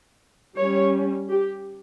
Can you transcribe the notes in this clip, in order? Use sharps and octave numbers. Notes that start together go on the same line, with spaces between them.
G3 C#4 C#5
G4